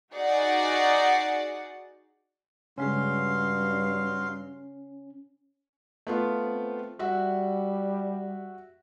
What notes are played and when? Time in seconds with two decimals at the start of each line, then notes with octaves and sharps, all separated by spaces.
0.13 D#4 F#4 G#4 D5 F#5
2.78 G2 C#3 F#3 G#3 C#4 G#4 F5 C6
6.07 A3 B3 F4
6.44 C4
6.99 G3 F#4 E5 F#5